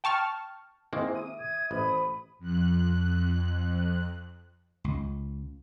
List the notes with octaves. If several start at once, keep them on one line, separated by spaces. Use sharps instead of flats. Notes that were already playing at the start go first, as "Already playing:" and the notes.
G5 A5 C#6 F6
D#3 G#3 A#3 C4 E4 G#4
E5 D#6
D#6 G#6
A1 C5 B5
F2 F#6
C#2